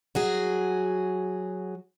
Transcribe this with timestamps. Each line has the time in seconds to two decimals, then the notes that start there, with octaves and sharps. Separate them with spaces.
0.15 F#3 F#4 G#4